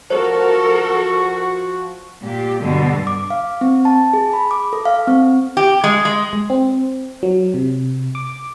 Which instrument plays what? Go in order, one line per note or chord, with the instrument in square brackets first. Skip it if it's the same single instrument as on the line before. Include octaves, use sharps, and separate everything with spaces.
[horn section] F3 F#4 [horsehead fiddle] A4 A#4 [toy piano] C5
[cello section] A#2 G4
G2 B2 D3 G3
[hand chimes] D6
F5
C4
A5
G#4
B5
D6
A4
F5
C4
[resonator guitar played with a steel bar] G4
G#3
G#3
[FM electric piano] G#3
C4
F#3
C3
D6